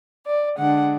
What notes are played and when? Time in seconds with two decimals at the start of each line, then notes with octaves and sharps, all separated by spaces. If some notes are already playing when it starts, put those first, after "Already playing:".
0.26 D5
0.57 D3 G#3 D4 F#5